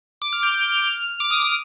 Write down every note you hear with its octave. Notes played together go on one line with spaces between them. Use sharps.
D6
F6
G6
F6
D6
D#6
D#6